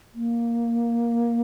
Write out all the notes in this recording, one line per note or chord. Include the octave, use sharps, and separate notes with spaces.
A#3